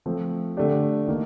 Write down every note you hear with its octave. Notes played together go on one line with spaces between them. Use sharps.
F3 A3 C4
D3 A3 D4 G4
D#3 A#3